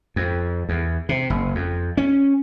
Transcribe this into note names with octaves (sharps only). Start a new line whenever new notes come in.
F2
E2
C3
F#1
F2
C#4